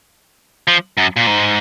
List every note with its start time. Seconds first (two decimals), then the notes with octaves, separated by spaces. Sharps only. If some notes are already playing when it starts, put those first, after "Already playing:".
0.68 F3
0.97 F#2
1.16 A#2
1.27 G#2